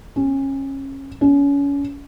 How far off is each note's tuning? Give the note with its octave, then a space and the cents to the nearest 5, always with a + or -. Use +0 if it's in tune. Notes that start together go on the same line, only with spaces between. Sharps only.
C#4 -25
C#4 +30